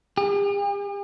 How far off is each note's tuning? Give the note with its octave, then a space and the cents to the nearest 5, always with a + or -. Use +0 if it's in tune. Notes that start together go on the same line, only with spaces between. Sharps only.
G4 +45